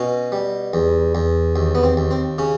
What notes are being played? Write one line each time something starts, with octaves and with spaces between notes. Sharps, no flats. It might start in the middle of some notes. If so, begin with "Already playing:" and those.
Already playing: B2 C#4
G3
E2
E2
D#2
B3
C4
D#2
C4
C#3 C#4